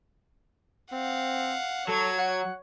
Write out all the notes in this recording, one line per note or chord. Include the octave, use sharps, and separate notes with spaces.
C4 F5 F#5
F#3 A4 C#5 G#6
F#5